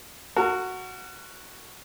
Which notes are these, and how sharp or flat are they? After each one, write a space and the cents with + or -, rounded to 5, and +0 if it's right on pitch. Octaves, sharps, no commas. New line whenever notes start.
F#4 +0 A#4 -35